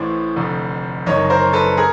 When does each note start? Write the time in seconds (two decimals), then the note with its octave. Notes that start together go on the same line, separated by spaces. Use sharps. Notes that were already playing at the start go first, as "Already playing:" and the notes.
Already playing: A1 A2 E3 C5 D5
0.36 F1 F2 D3
1.06 F#1 F#2 D#3 C#5 D#5
1.30 A#4 C5
1.53 A4 B4
1.77 G#4 A#4